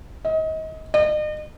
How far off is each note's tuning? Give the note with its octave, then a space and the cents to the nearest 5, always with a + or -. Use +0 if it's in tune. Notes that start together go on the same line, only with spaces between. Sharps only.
D#5 +30
D#5 -40